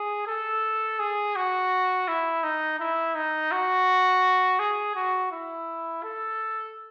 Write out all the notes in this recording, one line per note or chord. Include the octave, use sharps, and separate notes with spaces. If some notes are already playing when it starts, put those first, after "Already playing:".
Already playing: G#4
A4
G#4
F#4
E4
D#4
E4
D#4
F#4
G#4
F#4
E4
A4